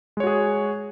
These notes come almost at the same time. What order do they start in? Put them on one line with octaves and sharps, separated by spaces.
G#3 C#5 F#4 G#4